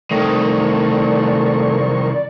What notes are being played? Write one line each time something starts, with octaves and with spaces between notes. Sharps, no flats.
C2 D#3 A3 A#4 C5 D5 C#6